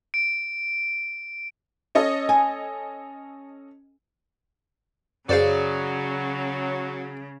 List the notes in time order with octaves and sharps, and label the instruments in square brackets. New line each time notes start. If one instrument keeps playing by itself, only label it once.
[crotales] D7
[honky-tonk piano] C#4 A4 D#5
[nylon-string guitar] G#5
[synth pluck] F#2 C5 F5 [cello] C#3 [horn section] F#3 [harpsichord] G#4 D5